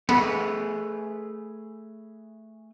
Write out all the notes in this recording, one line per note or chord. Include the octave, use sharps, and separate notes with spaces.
A3 B3 G#4 B4